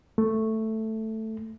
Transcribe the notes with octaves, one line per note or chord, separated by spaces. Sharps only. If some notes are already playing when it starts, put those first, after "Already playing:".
A3